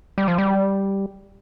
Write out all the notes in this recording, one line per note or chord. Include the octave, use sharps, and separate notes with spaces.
G3
F3
G3